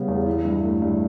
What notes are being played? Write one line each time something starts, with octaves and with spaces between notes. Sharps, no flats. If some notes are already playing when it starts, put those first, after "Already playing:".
Already playing: C#3 G3 B3
E2
E3
G2
A3
G2